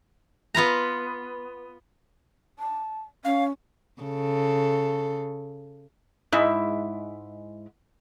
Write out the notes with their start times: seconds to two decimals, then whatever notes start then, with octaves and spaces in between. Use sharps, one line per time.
0.54 B3 F4 B4 A#5
2.59 A5
3.25 C#4 F5
4.02 C#3 A4
6.32 G#2 G#3 E4 E5